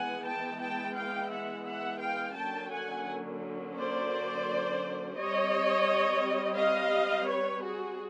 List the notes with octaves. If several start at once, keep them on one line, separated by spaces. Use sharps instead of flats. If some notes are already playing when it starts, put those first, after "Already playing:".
Already playing: E3 G#3 B3 F#5 G#5
G5 A5
G5 A5
F5 G5
E5 F#5
E5 F#5
F5 G5
D3 F#3 A#3 C#4 G5 A5
F#5 G#5
C5 D5
G3 C4 C#5 D#5
D#5 F5
B4 C#5
F#4 G#4